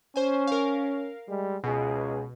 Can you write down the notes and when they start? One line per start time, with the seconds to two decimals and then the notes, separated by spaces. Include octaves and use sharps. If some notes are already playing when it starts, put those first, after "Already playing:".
0.16 C#4 C5 G#5
0.47 A#4 F5
1.28 G3 G#3
1.64 C#2 B2 G#4